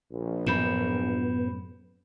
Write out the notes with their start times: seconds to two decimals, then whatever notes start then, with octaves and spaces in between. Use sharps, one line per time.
0.12 A#1
0.47 F#2 A2 C3 B3 B5 G6 E7